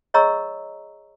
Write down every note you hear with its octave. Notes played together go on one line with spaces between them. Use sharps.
G#4 C#5 D#5 A#5 C#6 E6